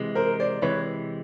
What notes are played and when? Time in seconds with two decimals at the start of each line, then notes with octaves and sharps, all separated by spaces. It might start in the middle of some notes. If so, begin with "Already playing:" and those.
Already playing: C3 E3 G#3
0.15 A#4 C5
0.40 C5 D5
0.62 C3 E3 G#3 B4 C#5